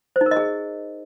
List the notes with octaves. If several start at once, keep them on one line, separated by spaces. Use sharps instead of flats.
C5
D#4
A#4
D#5
G#4